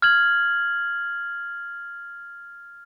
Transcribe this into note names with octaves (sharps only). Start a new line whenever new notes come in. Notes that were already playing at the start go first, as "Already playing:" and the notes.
F6 G#6 F#7